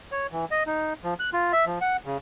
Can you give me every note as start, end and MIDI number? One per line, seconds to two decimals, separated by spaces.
0.12 0.27 73
0.32 0.45 52
0.51 0.63 75
0.66 0.93 63
1.04 1.14 53
1.19 1.30 90
1.33 1.52 65
1.53 1.65 76
1.66 1.79 53
1.81 1.97 78
2.05 2.17 49